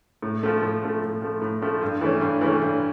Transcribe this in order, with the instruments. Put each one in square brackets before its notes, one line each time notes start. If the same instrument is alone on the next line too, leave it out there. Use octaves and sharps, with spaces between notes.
[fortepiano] A2
F3 A3
A2
F3 A3
A2
F3 A3
A2
F3 A3
G2
E3 A3 C#4
G2
E3 A3 C#4
G2